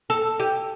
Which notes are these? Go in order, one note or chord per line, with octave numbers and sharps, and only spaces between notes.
A4
G4